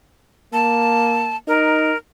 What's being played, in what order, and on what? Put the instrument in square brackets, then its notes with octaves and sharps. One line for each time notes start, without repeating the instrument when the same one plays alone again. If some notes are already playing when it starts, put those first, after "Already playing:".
[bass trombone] A#3 [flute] A5
[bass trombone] D#4 [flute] A#4